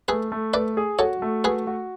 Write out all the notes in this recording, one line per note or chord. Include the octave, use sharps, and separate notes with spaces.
A3 G#4 B4
A3
A3 B4 D5
G#4
F#4 A4 C#5
A3
F#4 G#4 B4
F#4